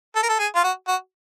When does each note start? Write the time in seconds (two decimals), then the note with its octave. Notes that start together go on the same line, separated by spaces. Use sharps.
0.16 A4
0.23 A#4
0.29 A4
0.39 G#4
0.56 F4
0.64 F#4
0.88 F#4